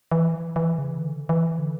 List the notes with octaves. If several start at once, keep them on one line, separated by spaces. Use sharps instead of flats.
E3
E3
C#3
D3
E3
D3